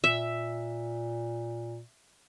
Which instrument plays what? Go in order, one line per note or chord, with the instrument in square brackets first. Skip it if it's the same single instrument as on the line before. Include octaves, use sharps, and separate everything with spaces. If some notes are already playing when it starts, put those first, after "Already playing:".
[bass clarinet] A#2 [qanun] E5